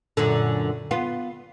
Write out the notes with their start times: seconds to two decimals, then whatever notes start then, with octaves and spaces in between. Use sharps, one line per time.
0.17 F#2 A#2 D3
0.91 B3 F4